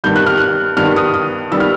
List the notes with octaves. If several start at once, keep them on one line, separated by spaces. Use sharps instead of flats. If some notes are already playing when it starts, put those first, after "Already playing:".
G2 D#3 G3 B3 G6
F#6
F6
F#6
G2 D#3 G3 B3 F6
D#6
D#6
D#3 G3 B3 E6
F6